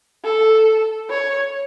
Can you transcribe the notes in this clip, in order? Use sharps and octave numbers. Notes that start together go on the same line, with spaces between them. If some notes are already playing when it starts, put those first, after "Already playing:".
A4
C#5